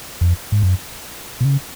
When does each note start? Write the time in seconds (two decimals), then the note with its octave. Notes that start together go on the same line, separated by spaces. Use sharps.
0.21 F2
0.52 G#2
0.62 F#2
1.40 B2
1.45 C#3